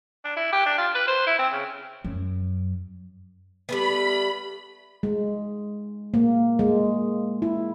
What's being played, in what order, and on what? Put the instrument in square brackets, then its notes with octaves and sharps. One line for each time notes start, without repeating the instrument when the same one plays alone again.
[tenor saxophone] D4
E4
G4
D4
F4
B4
C5
E4
C4
C#3
[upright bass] F#2
[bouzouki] G3 A3 B3 [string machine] B5
[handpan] G#3
A#3
G#3
E4